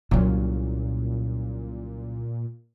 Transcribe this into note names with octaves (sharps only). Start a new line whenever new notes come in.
C2 A#2 C#3 F#3